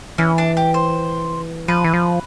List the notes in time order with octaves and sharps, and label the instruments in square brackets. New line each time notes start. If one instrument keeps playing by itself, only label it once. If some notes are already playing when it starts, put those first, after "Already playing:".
[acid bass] E3 [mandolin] C#4
[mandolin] D4
G4
C5
[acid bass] F3 [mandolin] B4
[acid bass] E3
F3